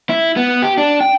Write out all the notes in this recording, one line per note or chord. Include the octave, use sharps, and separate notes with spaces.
E4
B3
G4
D4
G5